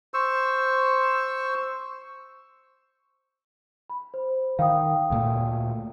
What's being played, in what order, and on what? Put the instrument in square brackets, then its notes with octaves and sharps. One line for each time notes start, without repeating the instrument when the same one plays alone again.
[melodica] C5 C#6 E6
[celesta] B5
C5
[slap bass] D#3 [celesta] F5 G5 D#6
[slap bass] D2 A#2 A3